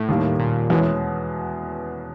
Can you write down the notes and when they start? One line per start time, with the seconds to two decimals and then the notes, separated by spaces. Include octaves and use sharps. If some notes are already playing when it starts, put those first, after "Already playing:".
Already playing: A2
0.09 D#2 D#3 G3 A#3
0.40 A#2
0.70 E2 B2 E3 G#3 C#4